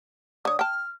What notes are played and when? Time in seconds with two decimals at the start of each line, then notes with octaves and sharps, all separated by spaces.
0.45 D3 C#5 D#6
0.59 G5 A5 F6